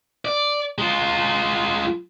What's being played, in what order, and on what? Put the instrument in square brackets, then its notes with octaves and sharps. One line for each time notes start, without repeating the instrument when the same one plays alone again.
[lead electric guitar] D5
G#3 F4